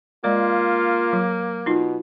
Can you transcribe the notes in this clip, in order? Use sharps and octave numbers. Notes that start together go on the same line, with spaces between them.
G#3 A#3 F4 D5
F#3
B2 D#4 F4